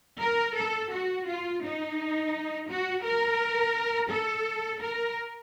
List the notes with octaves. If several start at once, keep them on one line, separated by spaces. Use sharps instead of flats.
A#4
A4
F#4
F4
D#4
F#4
A#4
A4
A#4